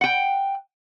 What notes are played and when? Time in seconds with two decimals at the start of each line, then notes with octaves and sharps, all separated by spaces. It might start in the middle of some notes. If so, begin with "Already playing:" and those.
0.01 F#5 G5